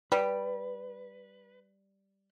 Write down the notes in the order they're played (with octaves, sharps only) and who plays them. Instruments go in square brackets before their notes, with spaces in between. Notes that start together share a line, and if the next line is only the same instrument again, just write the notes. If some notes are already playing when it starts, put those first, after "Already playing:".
[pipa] G3 [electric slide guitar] B4